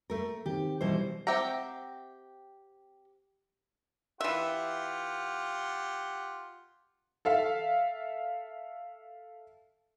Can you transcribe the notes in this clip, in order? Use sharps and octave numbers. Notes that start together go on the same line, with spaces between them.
A3 A#4
D#3 C4 G4
B2 E3 F#3 G3 C5
C4 G4 E5 F#5 A#5
E3 F4 G4 E5 F#5
A4 E5 F5